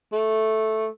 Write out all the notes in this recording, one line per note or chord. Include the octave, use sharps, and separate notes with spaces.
A3